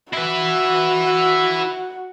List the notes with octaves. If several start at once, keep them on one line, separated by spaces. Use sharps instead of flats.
E4 F#4 B4